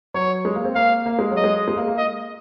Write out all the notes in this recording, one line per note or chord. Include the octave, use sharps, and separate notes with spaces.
F#3 C#5
G#3
A#3
C4
A#3 F5
A#3
G#3
F#3
D#5
G#3
G#3
A#3
A#3
D#5